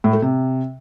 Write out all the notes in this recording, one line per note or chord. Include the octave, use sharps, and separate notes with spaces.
A2
A3
C3